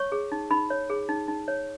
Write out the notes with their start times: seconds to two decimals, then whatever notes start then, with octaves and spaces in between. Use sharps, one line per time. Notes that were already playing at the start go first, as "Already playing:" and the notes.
Already playing: C#5 C#6
0.12 G#4
0.32 D#4
0.51 D#4 B5
0.70 C#5
0.90 G#4
1.09 D#4
1.28 D#4
1.48 C#5